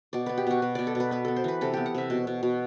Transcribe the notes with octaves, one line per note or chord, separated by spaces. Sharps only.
B2 D5
B3 B4
G4
B2 F#4
B2 B4
B2 D5
A4
B2
B4
B3 B4
B3 A4
C5
E3 B4
C3 A4
B3 G4
F#5
C3 E5
B2
B2
B2